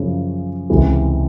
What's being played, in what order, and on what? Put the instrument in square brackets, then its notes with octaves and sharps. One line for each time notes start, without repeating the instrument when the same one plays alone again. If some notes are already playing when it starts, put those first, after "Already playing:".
Already playing: [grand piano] F#2 C#3 F3
C#2 C3 E3 G#3 C4